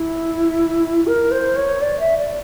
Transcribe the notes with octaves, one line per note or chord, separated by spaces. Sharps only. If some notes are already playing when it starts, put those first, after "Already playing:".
Already playing: E4
A#4
C5
C#5
D5
E5
D5